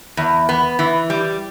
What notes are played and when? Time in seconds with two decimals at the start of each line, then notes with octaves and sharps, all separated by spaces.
0.17 E2
0.49 B3
0.79 E3
1.10 G3